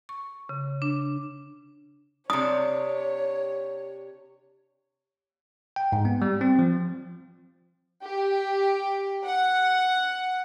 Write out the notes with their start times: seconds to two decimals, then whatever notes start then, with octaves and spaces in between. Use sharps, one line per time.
0.09 C#6
0.49 C#3
0.82 D4
2.30 C3 D4 C#5 D#6
5.76 G5
5.92 G#2
6.05 B3
6.22 G3
6.41 C4
6.59 F3
8.03 G4
9.26 F#5